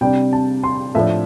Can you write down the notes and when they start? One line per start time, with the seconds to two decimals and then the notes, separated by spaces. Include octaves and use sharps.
0.01 C3 G3 D4 G5
0.33 A5
0.64 C6
0.95 A2 F3 A3 D4 E5